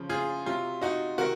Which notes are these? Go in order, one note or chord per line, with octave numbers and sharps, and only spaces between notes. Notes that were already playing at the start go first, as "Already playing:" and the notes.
Already playing: C#3 F3
F4 G#4
C3 F#3 F4
D#4 F#4
C3 D#3 F#4 A#4